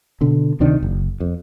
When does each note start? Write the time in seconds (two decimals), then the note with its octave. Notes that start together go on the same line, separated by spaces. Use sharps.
0.21 B2 D3
0.60 D2 C3 D#3 D4
0.82 F#1
1.20 F2